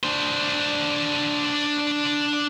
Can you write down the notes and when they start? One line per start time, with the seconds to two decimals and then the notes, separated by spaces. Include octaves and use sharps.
0.04 D4 C5